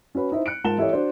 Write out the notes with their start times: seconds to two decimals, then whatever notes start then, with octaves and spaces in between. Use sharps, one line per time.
0.15 C#4 F#4 B4
0.32 D#4 E4 C5
0.46 F#6 C#7 D7
0.64 G#2 F4 A#4 A5 E7 G7
0.78 E3 E4 G4 A4 C#5 D#5
0.92 D4 F#4 C5 D5